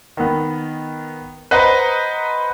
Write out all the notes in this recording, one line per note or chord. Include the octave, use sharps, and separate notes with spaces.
D#3 B3
B4 C5 D#5 F#5 A#5